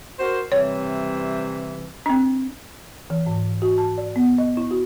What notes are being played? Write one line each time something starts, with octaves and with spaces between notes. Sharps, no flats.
F#4 A#4 C5
C3 E3 G3 C#5
C4 D4
E3
G#2
F#4
A5
D5
B3
D#5
E4
F#4